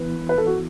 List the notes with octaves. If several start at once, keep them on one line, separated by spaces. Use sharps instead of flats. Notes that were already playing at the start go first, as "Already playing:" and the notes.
Already playing: E3 B3 E4 B4
B4
A4
F#4